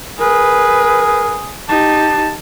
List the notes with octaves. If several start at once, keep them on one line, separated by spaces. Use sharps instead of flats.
G#4 A#4 B4
D#4 G4 A5